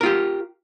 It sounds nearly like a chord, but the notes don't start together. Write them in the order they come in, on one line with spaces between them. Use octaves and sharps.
A#4 F4 G4